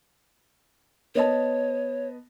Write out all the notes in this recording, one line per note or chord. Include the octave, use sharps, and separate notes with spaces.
B3 C#5 D#5 A5